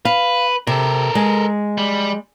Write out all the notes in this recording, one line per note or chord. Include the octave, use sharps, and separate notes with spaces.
B4 F5
C3 A4 A#4
G#3
G3